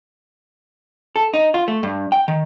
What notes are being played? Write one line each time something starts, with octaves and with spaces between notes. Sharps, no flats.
A4
D#4
F4
A3
G2
G5
D#3